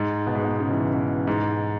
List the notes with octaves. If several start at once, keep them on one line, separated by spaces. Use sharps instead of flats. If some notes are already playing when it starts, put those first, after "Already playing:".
Already playing: G#2
B2
G#2
B2
C#3
E3
C#3
B2
G#2